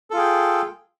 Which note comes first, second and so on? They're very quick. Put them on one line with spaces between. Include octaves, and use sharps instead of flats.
A4 F4 G#4 G5